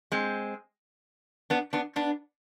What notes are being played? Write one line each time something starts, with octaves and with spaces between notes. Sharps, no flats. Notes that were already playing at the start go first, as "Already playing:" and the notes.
G#3 C4
B3 D4
B3 D4
B3 D4